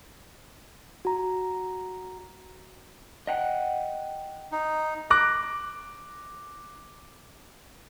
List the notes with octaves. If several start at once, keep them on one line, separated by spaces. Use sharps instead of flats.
F#4 A#5
D#5 F#5 G5
D#4
D6 F#6 A#6